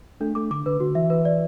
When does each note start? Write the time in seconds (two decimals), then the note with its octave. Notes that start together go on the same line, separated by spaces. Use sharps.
0.20 A3 D4
0.35 A3 D6
0.51 D3 D6
0.66 D3 B4
0.80 D3 F#4
0.95 E3 E5
1.10 B4
1.25 D5